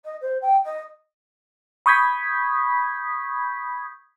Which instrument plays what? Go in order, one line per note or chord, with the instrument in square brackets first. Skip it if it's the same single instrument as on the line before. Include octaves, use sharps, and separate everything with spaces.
[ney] D#5
C5
G5
D#5
[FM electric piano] B5 C#6 D#6 G6 G#6 B6